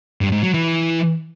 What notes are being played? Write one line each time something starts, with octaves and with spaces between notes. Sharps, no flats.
G2
G#2
F#3
E3